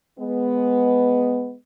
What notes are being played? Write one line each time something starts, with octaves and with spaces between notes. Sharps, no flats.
G#3 B3